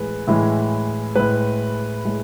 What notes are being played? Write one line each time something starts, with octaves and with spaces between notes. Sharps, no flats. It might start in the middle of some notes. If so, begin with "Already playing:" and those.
Already playing: A2 E3 G#3 B4
A2 E3 G#3
A2 G#3 B4
A2 G#3